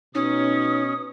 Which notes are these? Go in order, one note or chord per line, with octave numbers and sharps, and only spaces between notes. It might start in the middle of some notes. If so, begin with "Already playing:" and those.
B2 C#4 D#4 D#6